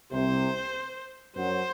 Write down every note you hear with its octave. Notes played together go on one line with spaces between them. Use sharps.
C2 C3 C5
F#2 F#3 C5